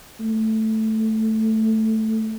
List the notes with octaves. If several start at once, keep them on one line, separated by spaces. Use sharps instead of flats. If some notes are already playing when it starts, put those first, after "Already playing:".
A3